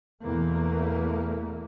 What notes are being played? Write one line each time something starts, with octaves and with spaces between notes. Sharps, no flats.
E2 B2 E3 A3 A#3